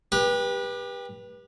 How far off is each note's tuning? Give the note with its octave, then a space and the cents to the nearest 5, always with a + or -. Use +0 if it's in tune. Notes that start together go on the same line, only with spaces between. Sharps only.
G4 +25 B4 -25